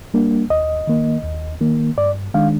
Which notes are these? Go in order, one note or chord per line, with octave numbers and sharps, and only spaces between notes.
G3 A#3 D4
D#2 D#5
D#3 A#3
D#2
D#3 A#3
G2 D5
D#3 G#3 D4 F5